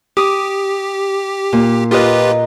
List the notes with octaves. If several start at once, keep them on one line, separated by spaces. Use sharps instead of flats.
G4 D6 D#6
A#2
F4 G4 A#4 B4 D#5